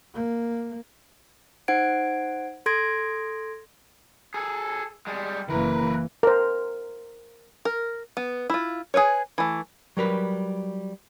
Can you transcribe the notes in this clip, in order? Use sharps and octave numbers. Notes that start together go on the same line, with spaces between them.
A#3
D#4 C5 F#5 G#6 D7
A4 C6 G#6 A#6 D7
G#4 A4
G3 G#3
F#1 E3 A#3 A#4 B4
A#4 C5
A#4
B3
E4 F4
G#4 A#4 B4 C#5
E3 A3
F#3 G3 A#4 B4